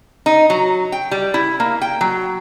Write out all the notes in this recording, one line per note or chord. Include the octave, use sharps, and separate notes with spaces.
D#4
F#3
G5
G3
E4
A#3
G5
F#3